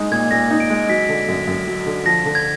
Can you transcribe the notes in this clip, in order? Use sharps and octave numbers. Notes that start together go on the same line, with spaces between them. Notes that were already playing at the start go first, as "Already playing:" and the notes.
Already playing: G#3 D#4
A#2 G#6
A#2 A#6
D#4
D7
G#3
F#3 B6
D3
F#2
F#2
F#3
D3
F3 A#6
D3
G#6